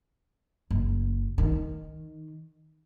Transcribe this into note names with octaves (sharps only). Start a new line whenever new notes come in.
F#1
D#3